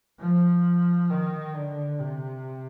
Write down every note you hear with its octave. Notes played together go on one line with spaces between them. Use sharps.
F3
D#3
D3
C3